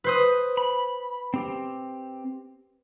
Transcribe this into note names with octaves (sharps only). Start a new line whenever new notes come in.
B4 C5 D#6
B5
C4 G4